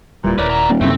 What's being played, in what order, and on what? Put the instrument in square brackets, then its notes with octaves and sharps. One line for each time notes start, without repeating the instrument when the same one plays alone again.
[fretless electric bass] D1 G3 [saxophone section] A#2 E3
[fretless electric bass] D#1 [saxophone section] E4 A#4 D5 [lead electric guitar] B4 C#5
[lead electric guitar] F#5 A#5
[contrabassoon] D#1
[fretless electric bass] F#2 C3 D#3 [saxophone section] A2 A3 [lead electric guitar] C4